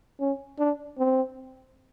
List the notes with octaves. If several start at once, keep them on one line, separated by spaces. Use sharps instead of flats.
C#4
D4
C4